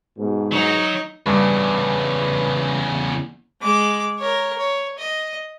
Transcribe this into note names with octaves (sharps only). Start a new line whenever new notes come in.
G#2 B2
F#3 D#4
E2 G2 C#3 B4
G#3 D6
A#4 C#5
C#5
D#5